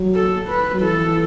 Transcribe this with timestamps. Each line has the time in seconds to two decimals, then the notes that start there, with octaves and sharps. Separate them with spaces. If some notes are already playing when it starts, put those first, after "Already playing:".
Already playing: F#3
0.15 A4
0.48 B4
0.74 F#3
0.81 E3 A4